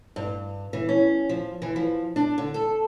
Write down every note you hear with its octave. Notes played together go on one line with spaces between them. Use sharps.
G2
E3
C#4
F3
E3
F3
D4
D3
A4